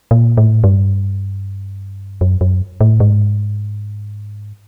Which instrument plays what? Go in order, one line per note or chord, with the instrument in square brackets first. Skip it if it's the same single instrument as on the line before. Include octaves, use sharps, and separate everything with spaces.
[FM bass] A#2
A2
G2
F#2
F#2
A2
G#2